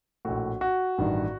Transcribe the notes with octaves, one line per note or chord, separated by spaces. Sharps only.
A#1 A2 F#4
F#4
A1 G2 D#3